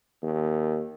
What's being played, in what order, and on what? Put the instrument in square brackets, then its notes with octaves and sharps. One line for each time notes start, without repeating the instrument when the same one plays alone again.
[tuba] D#2